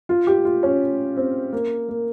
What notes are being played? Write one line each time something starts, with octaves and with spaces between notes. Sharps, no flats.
F4
G4
F4
C#4
C4
A#3
A#3